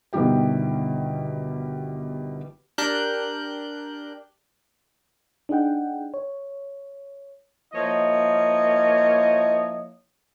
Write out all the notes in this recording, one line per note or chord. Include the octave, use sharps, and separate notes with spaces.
G1 B2 D#3 G3 G4 G5
D4 G4 A#4 F#6 G6
D4 D#4 G#4 F#5 G5
C#5
F3 A#3 E4 C#5 D#5